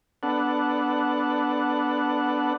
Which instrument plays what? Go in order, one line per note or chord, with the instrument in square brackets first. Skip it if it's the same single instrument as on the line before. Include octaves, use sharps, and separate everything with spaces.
[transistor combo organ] B3 D4 A4 F#5